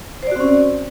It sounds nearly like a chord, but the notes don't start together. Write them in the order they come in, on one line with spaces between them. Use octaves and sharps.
C5 D5 F#4 C4 C#4